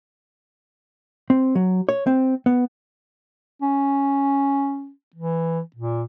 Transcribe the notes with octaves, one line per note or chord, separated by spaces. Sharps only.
C4
F#3
C#5
C4
B3
C#4
E3
A#2